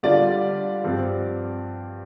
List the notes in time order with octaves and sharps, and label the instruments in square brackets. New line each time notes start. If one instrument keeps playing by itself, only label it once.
[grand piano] D3 G3 D4 F4 D5
G2 F3 C4